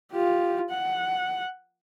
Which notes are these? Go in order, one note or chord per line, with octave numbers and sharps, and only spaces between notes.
F4 G4
F#5